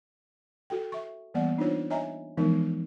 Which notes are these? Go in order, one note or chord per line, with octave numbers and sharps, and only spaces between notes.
F#4 A4 G5
E5 C#6
E3 G3 A#3 B3 D5 F#5
D4 D#4 F4 C5 C#5
C#5 D#5 E5 G#5 A#5
E3 F3 G#3 B3 D#4 A#4